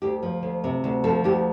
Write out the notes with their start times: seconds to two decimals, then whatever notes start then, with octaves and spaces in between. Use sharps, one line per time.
0.02 D2 G4
0.23 F3
0.43 D2
0.64 C3
0.84 D2
1.04 F3 A4
1.24 D2 G4